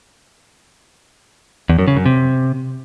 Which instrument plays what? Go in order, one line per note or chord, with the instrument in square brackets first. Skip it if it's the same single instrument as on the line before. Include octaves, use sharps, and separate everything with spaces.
[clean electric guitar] E2
F#2
C#3
F#2
C3